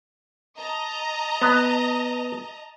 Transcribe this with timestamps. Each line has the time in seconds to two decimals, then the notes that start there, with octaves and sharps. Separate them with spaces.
0.57 D#5 A5 A#5
1.42 B3